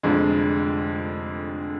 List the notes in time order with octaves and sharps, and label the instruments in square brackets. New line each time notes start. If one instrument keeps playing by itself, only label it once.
[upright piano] F1 F2 D3 G#3